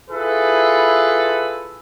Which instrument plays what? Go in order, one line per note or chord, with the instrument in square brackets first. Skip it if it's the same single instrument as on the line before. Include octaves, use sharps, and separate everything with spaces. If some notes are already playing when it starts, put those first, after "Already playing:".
[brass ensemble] E4 F4 G#4 A4 B4